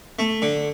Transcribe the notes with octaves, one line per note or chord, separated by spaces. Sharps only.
A3
D3